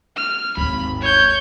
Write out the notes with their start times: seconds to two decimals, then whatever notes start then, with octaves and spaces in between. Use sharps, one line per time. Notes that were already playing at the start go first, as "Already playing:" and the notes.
0.16 F6
0.57 G#1 D#2 B5
1.01 C#5 G6